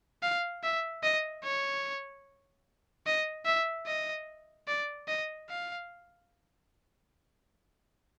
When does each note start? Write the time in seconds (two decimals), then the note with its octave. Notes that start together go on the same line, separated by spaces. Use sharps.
0.22 F5
0.63 E5
1.03 D#5
1.44 C#5
3.07 D#5
3.46 E5
3.87 D#5
4.68 D5
5.08 D#5
5.49 F5